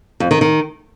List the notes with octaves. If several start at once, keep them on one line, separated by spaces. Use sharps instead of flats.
F2
D#3
D#3